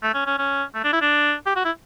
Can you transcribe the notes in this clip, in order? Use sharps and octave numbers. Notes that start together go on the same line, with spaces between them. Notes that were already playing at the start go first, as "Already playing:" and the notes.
A3
C#4
C#4
C#4
A3
D4
E4
D4
G4
F#4
E4